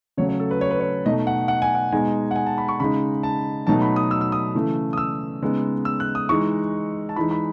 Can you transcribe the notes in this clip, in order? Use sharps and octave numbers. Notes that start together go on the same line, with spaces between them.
C#3 F#3 A3 C#5
C#5
A4
B4
C#5
B4
C#5
B2 A3 D#4 D#5
F#5
F#5
G#5
F#5
B2 G#3 D#4 G#5
F#5
G#5
A5
B5
C#6
C#3 G#3 D#4 B5
A5
B2 F#3 A3 D#4 A5
B5
D#6
E6
E6
D#6
C#3 E3 A3
D#6
E6
C#3 G#3 B3 D#4
E6
F#6
D#6
E3 G#3 D#4 C#6
A5
E3 G#3 D#4 B5
B5